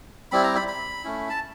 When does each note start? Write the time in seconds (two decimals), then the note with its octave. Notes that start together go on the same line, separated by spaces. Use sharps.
0.32 G3 C4 E4 B5
0.44 A#5
0.56 B5
0.68 B5
1.04 A3 C#4 E4
1.29 A5